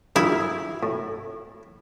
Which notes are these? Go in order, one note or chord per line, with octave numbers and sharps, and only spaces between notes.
F#2 E4 F4 G#4
A2